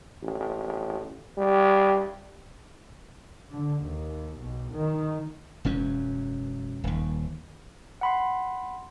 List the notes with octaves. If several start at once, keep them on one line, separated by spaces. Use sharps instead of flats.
A1
G3
D3
D#2
B1
D#3
E1 F#2 C#4
D#1 D#2
F#5 B5 C6